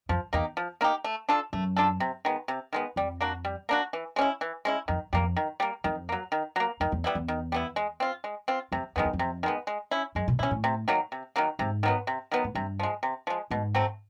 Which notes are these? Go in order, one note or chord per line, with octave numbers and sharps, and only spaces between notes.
F2 F3
E2 A#3 D#4 G4
F3
A#3 D#4 G4
A3
D4 F4 A4
F#2 A3
D4 F4 A4
C3
D#3 G#3 B3
C3
D#3 G#3 B3
F2 G3
A#3 D4 F#4
G3
A#3 D4 F#4
E3
G#3 C#4 E4
E3
G#3 C#4 E4
F2 D#3
F2 G3 A#3
D#3
G3 A#3
F2 D#3
F#3 A#3
D#3
F#3 A#3
F2 D#3
E2
G3 B3 E4
E2
D#3
G3 B3 E4
G#3
C4 F4
G#3
C4 F4
F2 C3
F2 D#3 G#3 B3
E2
F2
C3
D#3 G#3 B3
G#3
C#4 E4
F#2 G#3
B2
A#2 C#4 E4
A2
C3
D#3 F#3 A#3
C3
D#3 F#3 A#3
G#2 C3
D#3 F#3 B3
C3
D#3 F#3 B3
G#2
G2 C3
F3 G#3
C3
F3 G#3
G#2 B2
F#3 A3 C4